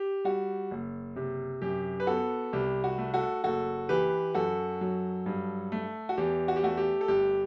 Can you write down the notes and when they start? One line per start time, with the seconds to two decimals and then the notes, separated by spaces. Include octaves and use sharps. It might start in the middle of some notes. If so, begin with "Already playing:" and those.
Already playing: G4
0.24 G3 F#4
0.71 F#1
1.16 C3
1.62 F#2 G4
2.00 B4
2.07 B3 F#4 A4
2.53 C2 G4
2.84 F#4
2.98 A3
3.14 F#4 A4
3.44 F#1 F#4 A4
3.89 E3 G4 B4
4.34 F#2 F#4 A4
4.81 F#3
5.26 G2
5.72 A3
6.09 F#4
6.18 E2 G4
6.48 F#4
6.56 G4
6.63 A3 F#4
6.77 G4
7.01 A4
7.08 G1 G4